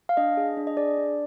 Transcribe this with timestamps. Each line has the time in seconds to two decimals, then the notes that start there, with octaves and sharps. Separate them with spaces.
0.09 F5
0.17 D4 D#5
0.37 G#4
0.57 D4
0.67 D#5
0.77 G#4 D5
0.98 D4